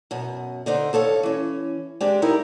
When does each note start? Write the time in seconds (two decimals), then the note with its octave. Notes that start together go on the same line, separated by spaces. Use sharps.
0.11 F#2 B2
0.66 D3 D#4 C5
0.93 D#2 A4 C#5 F5
1.23 E3 C#4
2.01 G#3 C4 D4 G4
2.22 F#3 D#4 E4 G4 A#4